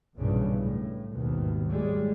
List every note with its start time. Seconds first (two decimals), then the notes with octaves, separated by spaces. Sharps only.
0.16 B1 G2 A#2 C#3 E3
0.55 A2
1.14 G#1 D#2 B2 D#3
1.68 A2 G3 G#3